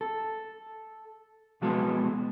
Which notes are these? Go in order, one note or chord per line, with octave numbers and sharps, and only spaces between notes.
A4
B1 F3 G#3 B3 F#4 A4